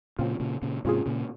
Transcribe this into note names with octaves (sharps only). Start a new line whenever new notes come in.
A#2 C#3 F#3 C4 F4
A#2 C#3
A#2 C#3
G#2 C3 F#3 C#4 F4 G#4
A#2 C#3